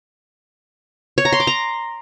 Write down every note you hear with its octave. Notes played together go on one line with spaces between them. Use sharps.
C#5
A#5
C6
D6
A#5